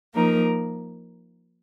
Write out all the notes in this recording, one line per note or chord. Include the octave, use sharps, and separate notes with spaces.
F3 A#3 D#4 A#4